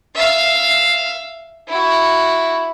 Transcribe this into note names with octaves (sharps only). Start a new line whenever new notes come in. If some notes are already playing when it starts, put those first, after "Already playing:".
E5 F5
E4 F#4